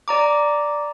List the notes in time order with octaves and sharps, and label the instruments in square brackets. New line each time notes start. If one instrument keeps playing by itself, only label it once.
[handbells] D5 A#5 D6